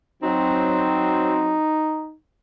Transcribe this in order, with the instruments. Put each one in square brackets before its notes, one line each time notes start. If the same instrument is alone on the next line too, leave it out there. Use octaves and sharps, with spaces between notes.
[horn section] F#3 C4 [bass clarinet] D#4